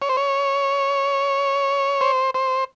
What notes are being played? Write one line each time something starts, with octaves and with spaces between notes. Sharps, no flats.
C#5
C5
C#5
C5
C5